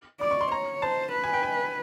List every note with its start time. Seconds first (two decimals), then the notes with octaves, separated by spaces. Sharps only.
0.21 D5 D6
0.31 C#6
0.41 C6
0.52 C#5 A#5
0.82 C5 A5
1.13 B4
1.24 G#5
1.33 G5
1.43 G#5